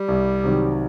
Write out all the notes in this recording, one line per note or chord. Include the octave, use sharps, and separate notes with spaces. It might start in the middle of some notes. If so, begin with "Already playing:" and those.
Already playing: G3
C2
C3 D#3 F#3